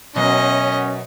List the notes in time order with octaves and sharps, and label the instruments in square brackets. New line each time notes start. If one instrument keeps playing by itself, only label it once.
[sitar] F#2 [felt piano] B2 A#6 [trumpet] C#4 [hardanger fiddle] D#5